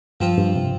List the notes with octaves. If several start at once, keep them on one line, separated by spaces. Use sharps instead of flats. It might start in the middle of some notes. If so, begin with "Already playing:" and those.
G2 F3 C4 F4
G2
C3